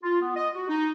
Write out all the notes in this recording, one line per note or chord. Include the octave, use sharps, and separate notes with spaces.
F4
B3
D#5
F#4
D#4